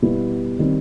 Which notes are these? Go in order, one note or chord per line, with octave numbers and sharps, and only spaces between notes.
B2 G3 B3 E4
D#3 G3 C4